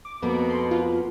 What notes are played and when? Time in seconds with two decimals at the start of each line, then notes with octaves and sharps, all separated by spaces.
0.05 D6
0.22 F2 B2 A#3 B3
0.50 C6
0.71 F4